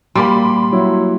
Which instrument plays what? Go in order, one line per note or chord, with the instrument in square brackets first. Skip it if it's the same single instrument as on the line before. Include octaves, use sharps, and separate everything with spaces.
[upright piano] A#2 [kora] G3 A#3 [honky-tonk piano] B5 C6
[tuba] F#3 [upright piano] E4